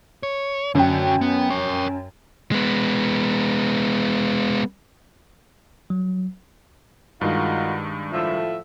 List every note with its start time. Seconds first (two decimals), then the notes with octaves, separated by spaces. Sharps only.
0.23 C#5
0.75 F#2 D3 F#4 G5
1.21 B3
1.50 A#4 C#5
2.52 G#3 B3
5.90 F#3
7.21 G2 D#3 G#3 D#4 F4 F#4
8.13 A2 F3 E5